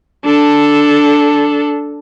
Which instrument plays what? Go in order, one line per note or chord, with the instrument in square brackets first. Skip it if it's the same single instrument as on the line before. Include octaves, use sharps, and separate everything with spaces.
[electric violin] D4 A4